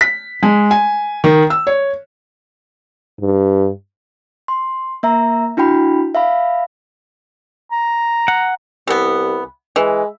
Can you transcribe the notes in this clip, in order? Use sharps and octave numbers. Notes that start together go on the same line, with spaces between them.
B6
G#3
G#5
D#3
E6
C#5
G2
C6
A#3 E5 A#5
D4 E4 F#4 G5 B5
E5 F5 B5
A#5
F#5
C2 E3 B3
E3 G#3